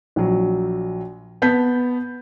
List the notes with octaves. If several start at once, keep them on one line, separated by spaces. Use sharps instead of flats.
A#1 F#3
B3 A5 G6 B6